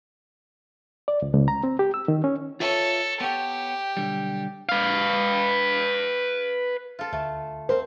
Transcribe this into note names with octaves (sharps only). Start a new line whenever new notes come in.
D5
C#2
C#2
A#5
C4
G4
E6
D#3
C#4
F4 A4 B4 C#5 E5
B3 G4 C#5
B1 D3 G3
B4 F5
F4 A4
D2 A3
C4 A#4 C5